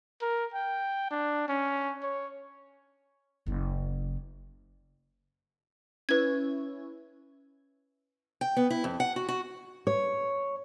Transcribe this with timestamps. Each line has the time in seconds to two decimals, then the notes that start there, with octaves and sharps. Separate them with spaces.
0.22 A#4
0.54 G5
1.11 D4
1.48 C#4
2.03 C#5
3.46 F#1 E4
6.09 C#4 E4 B4 G#6
8.41 G5
8.56 B3
8.70 E4
8.84 F2
9.00 F#5
9.16 F#4
9.29 F#4
9.87 C#5